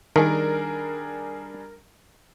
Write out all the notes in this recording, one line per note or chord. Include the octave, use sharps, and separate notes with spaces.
D#3 G3 D4 G#4 A#4